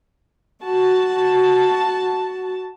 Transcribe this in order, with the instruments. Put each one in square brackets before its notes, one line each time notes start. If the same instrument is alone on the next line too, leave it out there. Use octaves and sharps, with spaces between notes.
[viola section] F#4 A5